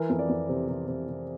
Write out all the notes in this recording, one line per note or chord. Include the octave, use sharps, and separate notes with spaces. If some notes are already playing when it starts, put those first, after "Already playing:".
Already playing: E3 A#4
F2
D5
F2
C3
C3
C3
C3